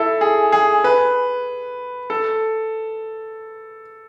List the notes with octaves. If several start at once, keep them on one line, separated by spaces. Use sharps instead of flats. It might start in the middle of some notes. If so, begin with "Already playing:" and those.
Already playing: E4 A4
G#4
G#4
B4
A4